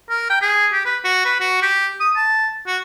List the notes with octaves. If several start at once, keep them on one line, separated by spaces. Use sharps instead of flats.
A#4
G5
G#4
G4
B4
F#4
B4
F#4
G4
D#6
A5
F#4